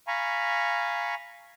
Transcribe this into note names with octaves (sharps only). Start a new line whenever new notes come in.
F5 G#5 A#5 B5 C#6